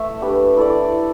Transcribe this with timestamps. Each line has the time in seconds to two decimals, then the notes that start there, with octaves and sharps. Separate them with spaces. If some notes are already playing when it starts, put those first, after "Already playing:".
Already playing: A3 E5
0.21 D4 G4 B4
0.57 E4 A4 D5